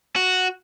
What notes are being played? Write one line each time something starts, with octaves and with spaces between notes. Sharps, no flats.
F#4